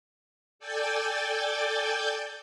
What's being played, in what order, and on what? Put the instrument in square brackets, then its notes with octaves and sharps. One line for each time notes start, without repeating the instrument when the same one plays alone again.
[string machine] A4 D5 G5 G#5 G6 A6